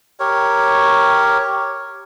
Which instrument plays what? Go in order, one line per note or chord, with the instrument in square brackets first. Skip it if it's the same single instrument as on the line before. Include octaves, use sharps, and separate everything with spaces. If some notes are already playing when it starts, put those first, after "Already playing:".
[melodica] G4 A#4 C#5